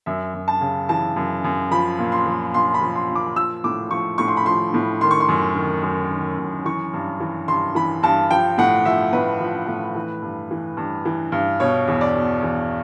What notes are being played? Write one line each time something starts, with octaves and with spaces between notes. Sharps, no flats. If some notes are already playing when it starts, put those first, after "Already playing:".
F#2 E5
F#2
A5
C#3
E3 A5
F#2
F#2
F3 B5
A#2
C6
F3
A#2 C6
B5
F3
C6
A#2
D6
F3 E6
A2 D6
F3 C#6
A2 C#6
C6
B5
F3 C6
A2
D#3 C6
C#6
C6
F#2
D#3
F#2
D#3
F#2
E3 C#6
G2
E3
G2 C6
E3 B5
G2 A5
F3 G5
A2 F#5
F3 E5
A2 B4
F3
A2
E3
G2
E3
G2
E3
G2
B2 C#5
E2
D5
B2
E2